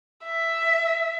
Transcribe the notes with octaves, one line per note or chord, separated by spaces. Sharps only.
E5